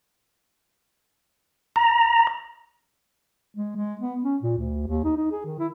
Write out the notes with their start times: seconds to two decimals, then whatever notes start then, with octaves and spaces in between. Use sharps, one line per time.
1.76 A#5
3.55 G#3
3.76 G#3
4.01 B3
4.23 C#4
4.42 A#2
4.58 D2
4.87 D#2
5.04 D#4
5.17 D#4
5.31 G#4
5.46 D#3
5.59 E4